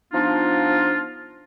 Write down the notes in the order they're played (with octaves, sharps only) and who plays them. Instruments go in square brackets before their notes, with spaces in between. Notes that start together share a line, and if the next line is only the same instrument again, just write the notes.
[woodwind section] F3 B3 D4 D#4 F4